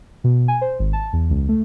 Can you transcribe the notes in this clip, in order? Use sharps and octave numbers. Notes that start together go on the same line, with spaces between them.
B2
G#5
C5
G#1
A5
E2
C#2
A3